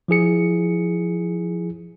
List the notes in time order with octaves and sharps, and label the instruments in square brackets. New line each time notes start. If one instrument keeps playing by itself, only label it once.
[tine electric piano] F3 E4 G#4 C#7